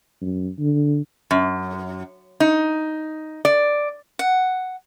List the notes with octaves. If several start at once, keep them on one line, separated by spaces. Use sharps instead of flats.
F#2
D3
F#2
D#4
D5
F#5